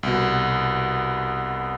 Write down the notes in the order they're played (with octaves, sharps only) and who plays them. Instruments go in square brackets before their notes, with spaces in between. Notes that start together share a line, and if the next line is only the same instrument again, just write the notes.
[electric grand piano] C2 B2